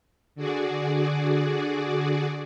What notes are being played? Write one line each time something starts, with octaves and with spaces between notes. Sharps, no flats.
D3 F#4 G#4 D5